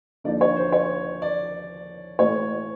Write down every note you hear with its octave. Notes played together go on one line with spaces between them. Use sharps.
D#2 D3 F3 A#3 D#4 D5
C#5
C5
C#5
D5
A2 E3 A3 C#5